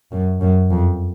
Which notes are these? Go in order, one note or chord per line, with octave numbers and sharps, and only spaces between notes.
F#2
F#2
F2